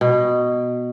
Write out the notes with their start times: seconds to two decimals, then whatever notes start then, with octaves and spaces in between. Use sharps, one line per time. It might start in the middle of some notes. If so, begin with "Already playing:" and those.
0.01 B2